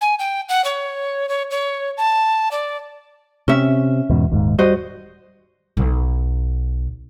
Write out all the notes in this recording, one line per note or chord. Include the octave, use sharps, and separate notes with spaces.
G#5
G5
F#5
C#5
C#5
C#5
A5
D5
C3 C#4 E5
E2 G#2 B2
D#1 D#2 G#2
G3 F#4 C5 D#5
B1